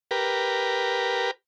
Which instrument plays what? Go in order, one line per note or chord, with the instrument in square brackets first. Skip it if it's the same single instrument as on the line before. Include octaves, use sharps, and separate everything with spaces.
[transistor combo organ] G4 A#4 B4